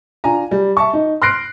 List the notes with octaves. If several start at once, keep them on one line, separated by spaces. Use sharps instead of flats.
D4 F4 G#5 A#5
G3
E5 A5 C#6
D#4
C6 F6 F#6 A#6 C7 D7